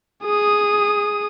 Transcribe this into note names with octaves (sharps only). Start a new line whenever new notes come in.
G#4 D#6